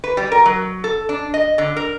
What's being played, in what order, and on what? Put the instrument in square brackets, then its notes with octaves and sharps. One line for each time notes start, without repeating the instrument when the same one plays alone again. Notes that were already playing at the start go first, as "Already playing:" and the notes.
[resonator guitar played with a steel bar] B4
G3
A#4
F#3
A4
D4
D#5
D3
A#4